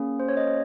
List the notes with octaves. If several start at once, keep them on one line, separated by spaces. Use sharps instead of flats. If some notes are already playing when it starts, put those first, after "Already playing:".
Already playing: A#3 C#4 G#4
C5
C#5
D#5